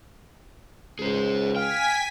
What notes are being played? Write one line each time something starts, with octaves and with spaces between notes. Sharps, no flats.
C#2 G#4 C5
F5 G5 G#5 B6